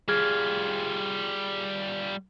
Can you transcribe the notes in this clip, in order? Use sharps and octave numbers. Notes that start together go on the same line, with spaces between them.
G3 F4 G#4 F6 G#6